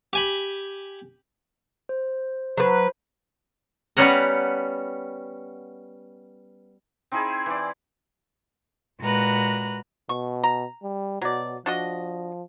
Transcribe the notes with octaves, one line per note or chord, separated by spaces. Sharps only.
G4 G#5 B5
C5
F#3 B4 C5
G3 B3 C#4 F#5 A#5
C4 D#4 E4 G#4
E3 D5
A#2 G#3 F#4 B4 A#5 F#6
B2 C#6
A#5
G3
B2 F#3 D5
F3 D4 F#4 D#5